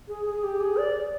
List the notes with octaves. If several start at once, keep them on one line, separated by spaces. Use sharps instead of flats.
G#4
G#4
G4
G#4
D5